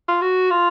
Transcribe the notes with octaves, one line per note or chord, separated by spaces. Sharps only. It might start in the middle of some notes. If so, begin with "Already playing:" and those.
F4
F#4
F4